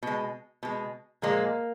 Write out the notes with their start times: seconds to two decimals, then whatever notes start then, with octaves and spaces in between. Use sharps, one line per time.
0.03 B2 G#3
0.63 B2 G#3
1.22 A#2 F3 G#3 A#3